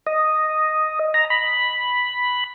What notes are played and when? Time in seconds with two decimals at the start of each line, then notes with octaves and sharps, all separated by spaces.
0.07 D#5
1.14 A#5
1.30 B5